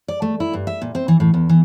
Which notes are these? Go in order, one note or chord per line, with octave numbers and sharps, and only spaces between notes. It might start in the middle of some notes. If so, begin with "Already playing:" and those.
D5
A3
E4
G2
E5
A#2
C4
E3
A2
E2
E3